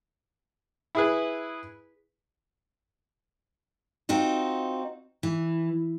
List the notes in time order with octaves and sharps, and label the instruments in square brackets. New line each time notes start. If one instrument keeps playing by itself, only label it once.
[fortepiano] E4 G#4 B4
[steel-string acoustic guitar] C4 D#4 F4 F#4
E3